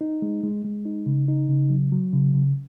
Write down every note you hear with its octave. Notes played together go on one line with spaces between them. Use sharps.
D#4
G#3
G#3
G#3
D#4
C#3
D#4
C#3
F#3
F#3
C#3
C#3